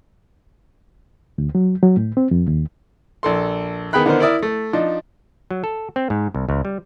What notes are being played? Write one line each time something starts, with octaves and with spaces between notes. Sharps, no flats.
D2
F#3
F#3
A2
C4
F2
D#2
A#1 A4 C6
D#3 B3 G#4 G5 B5 F#6
D3 D#3 B3 A#4 C5
E4 A#4 D5 E5 D#6 E6
A3
F3 D4 D#4
F#3
A4
C4
G#2
C2
C#2
G3